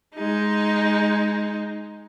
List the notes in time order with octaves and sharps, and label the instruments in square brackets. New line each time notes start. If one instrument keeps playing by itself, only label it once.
[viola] G#3 D#4